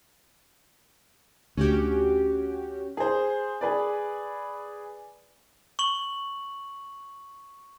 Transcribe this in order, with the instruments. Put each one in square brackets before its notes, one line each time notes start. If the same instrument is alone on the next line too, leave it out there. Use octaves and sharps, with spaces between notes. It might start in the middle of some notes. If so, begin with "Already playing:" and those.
[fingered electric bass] D2 [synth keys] C#4 F#4 G4
[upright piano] G#4 C5
G#4 B4 D5
[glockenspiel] C#6 F#7